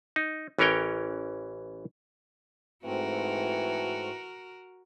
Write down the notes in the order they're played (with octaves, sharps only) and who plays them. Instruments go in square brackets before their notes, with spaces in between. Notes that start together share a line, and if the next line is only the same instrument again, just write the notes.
[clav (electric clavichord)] D#4
A1 E3 C#4 A#4 C#5 G5
[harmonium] G#2 A3 C4 [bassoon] E3 [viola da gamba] F#4 A#4